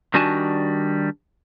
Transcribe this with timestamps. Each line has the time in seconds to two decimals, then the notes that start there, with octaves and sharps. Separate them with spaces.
0.14 D#3 G3 D4 F#4 G#5 A5